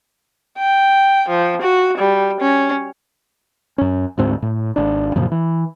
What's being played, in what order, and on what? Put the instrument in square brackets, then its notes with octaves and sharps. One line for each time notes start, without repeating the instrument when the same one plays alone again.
[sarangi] G5
F3
F#4
G3
C#4
[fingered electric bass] F#2 C#4
D2 G#2 C4
A2
G#1 D4
F#2 A#2 C#3 F3
E3